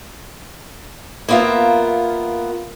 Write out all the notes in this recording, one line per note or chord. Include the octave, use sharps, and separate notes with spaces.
A#3 B3 F4 A#4 E5